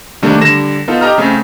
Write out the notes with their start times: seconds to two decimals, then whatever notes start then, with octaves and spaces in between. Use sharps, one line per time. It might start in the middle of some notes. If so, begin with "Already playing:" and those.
0.22 C3 D#3 G3 A3 A#3 D4
0.41 D3 G3 A#6 E7
0.88 B3 D#4 F4 A4
1.01 G4 D#5 A#5 F6
1.18 C#3 A3 C4